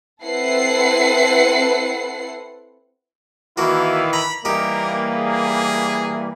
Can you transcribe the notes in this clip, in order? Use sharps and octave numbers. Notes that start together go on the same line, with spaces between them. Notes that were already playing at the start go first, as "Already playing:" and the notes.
C4 E4 A4 B4 F#5 C7
D#3 E3 A#3 E4 F#4 F5
A#5 B5
E3 G3 A#3 D#4 G4 A#4
G#4